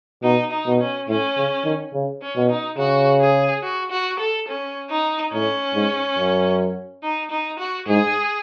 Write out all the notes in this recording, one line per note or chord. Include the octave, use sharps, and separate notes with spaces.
B2 D#4
D#4
B2
C#4
A2 C#4
C#3
D#3
C#3
C#4
B2
D#4
C#3 F#4
G#4
F#4
F#4
A4
C#4
D#4
A2 C#4
G#2
F#2
D#4
D#4
F#4
G#2 G#4